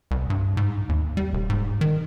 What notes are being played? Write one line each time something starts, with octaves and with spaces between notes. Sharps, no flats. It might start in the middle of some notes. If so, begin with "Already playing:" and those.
C2
G2
G#2
D#2
G3
E1
G#2
D#3